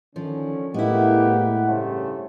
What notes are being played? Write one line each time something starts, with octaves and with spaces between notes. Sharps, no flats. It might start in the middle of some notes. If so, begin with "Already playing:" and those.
D3 D#3 F3 C#4
A2 G#3 A#3 B3 E4 G4 F#5
G2 C#3 A3 G4 C5 C#5